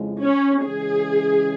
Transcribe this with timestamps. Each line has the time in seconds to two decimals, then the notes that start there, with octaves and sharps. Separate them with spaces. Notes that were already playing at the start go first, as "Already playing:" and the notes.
Already playing: F2 C#3 F3 G#3 E4
0.24 C#4
0.65 C#3 E3 G#3 C#4 G#4